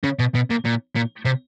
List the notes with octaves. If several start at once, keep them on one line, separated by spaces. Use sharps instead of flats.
C#3
B2
B2
A#2
A#2
A#2
C3